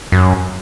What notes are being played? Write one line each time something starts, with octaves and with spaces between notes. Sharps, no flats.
F#2